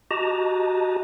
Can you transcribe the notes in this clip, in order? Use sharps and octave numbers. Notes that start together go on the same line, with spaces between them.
F#4 G4 D#5 A5 A#5